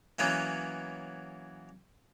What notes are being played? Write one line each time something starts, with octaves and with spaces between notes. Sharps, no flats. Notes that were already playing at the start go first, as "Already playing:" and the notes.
E3 F#3 A#3 B3 C#4